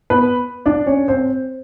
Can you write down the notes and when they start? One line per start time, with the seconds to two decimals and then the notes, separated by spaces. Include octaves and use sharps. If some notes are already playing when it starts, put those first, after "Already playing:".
0.10 B3 B4
0.66 D4 D5
0.87 C#4 C#5
1.08 C4 C5